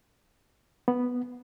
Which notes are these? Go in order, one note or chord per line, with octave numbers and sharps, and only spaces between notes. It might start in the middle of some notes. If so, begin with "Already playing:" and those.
B3